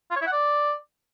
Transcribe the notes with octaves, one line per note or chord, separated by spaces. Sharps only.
F4
C#5
E4
F#5
D5